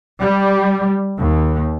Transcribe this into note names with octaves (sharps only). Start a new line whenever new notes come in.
G3
D#2